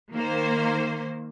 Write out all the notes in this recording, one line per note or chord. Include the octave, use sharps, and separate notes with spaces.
D#3 A#3 C5